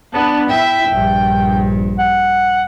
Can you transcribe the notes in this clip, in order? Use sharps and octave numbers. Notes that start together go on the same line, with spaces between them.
B3 D4 A5
E4 E5 G5
A#1 G2
F#5